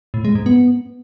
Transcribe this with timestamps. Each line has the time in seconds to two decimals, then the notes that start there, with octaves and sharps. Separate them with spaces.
0.14 A2
0.25 G#3
0.35 G#2
0.46 B3